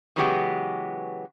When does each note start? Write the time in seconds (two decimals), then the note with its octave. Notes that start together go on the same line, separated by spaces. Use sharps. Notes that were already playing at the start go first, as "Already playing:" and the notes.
0.16 C#3 E3 F#3 G#3 B3 G4